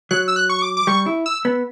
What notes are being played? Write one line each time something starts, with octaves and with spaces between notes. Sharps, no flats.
F#3 F#6
E6
F#6
C#6
D6
D6
G3 C#6
E4
E6
B3